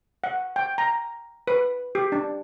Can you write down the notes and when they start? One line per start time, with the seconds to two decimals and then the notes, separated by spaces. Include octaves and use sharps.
0.24 F#5
0.56 G5
0.78 A#5
1.47 B4
1.95 G4
2.12 D4